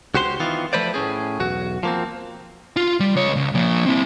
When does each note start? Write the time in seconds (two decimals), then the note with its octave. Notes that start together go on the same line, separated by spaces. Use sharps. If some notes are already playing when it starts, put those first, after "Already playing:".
0.14 C#2 F#4 G4 C5 C6
0.40 D#3 E3 B3 F4
0.73 F3 A3 B4 C5 D5
0.94 A2 C#4 G#4
1.40 B1 E2 F#4
1.83 F3 A#3 C4
2.77 F4
3.00 G3
3.15 C#2 C#5
3.36 C#2
3.55 F3 A#3
3.86 C4 E4